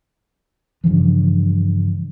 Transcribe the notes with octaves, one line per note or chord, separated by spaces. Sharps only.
G2 C#3 E3 F3